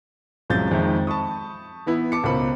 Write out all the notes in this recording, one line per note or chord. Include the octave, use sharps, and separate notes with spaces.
C2 F#2 F3 G#3 G6 A6
F2 D#3 G#3 E5
A5 B5 C#6 D#6
E3 B3 E4
A5 D6 C#7
C#2 B2 A#4 C5 B5